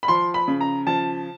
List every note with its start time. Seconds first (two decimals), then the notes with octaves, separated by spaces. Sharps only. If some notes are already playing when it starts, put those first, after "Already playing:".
0.03 B5
0.08 F3 C6
0.34 B5
0.48 C#3
0.61 A#5
0.87 F3 A5